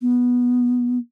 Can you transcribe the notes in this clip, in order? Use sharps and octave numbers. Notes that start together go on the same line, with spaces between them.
B3